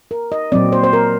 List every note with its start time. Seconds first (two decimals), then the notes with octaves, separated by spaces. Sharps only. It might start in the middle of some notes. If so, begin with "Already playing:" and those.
0.11 A#4
0.32 D#5
0.52 A#2 F#3 C4 D5
0.72 C5
0.84 C5
0.93 A#4